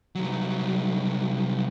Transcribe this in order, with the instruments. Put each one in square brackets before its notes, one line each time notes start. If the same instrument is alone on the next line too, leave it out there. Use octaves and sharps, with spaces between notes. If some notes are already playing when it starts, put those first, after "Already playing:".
[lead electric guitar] C2 F#3